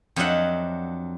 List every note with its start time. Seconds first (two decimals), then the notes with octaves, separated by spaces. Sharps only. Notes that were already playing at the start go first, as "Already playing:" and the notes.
0.16 F2 F#3 D4 D#5 E5 F#5